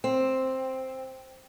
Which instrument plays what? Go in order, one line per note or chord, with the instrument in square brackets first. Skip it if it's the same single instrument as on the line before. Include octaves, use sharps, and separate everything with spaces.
[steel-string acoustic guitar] C4